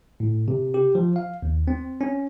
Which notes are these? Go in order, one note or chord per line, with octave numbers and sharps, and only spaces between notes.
A2
C3
G4
F3
F5
D#2
C4
C#4